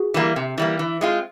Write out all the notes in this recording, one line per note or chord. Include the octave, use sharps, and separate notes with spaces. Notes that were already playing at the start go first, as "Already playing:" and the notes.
Already playing: F#4 G#4
E3 G3 A#3
C3
E3 G3 A#3
E3
G#3 C4 F4